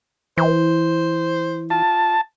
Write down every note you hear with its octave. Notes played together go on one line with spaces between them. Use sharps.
E3 C5
F4 A5